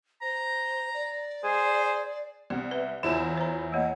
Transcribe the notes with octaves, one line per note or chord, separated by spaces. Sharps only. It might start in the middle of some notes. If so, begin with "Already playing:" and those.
C5 A#5
D5
G#4 C5
C2 B3
B4 E5
E2 E3 E4 F4 C#5 E7
C5 A#5
A3 A#3 C#5 D#5 F#5